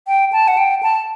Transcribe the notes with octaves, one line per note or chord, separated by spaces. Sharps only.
G5
A5
F#5
G5
A5